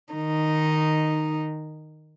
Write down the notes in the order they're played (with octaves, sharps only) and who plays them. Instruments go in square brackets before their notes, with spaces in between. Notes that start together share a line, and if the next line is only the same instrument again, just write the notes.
[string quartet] D#3 D#4